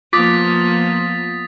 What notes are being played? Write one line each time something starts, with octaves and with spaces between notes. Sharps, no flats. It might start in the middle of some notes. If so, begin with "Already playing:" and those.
F3 A#3 B3 F4 D6 D#6 A6 B6